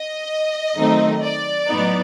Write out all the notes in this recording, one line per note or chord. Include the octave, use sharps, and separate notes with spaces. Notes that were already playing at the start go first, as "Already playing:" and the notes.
Already playing: D#5
D#3 F#3 A3 C4 D#4
D5
A2 F#3 B3 D#4